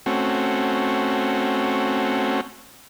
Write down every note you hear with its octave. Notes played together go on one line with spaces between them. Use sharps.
A3 C4 C#4 F#4